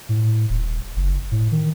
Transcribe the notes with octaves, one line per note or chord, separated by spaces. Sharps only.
A2
D#1
F#1
A2
D#3